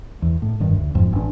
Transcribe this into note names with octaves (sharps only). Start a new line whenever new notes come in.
E2
A2
F1 G2 D#3
D2
E1 F2 G#2 F3
A1 D4